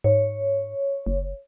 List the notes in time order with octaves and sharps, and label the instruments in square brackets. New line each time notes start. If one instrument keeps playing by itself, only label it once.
[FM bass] G#2 [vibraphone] C#5
[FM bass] F#1